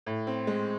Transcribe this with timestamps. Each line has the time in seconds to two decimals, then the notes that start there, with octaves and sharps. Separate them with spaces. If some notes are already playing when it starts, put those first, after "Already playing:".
0.07 A2
0.27 C4
0.47 G#3